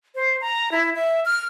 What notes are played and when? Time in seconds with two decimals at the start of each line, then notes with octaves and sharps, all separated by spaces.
0.15 C5
0.41 A#5
0.72 E4
0.95 E5
1.25 F6